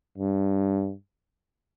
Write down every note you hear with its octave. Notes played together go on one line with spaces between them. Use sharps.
G2